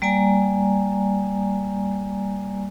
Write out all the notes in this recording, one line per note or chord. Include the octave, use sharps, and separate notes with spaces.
G3 A#3 D5 G#5 A#5